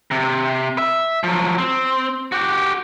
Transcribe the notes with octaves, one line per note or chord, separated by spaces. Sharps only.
C3
E5
F3 F#3
C4
F#4 G4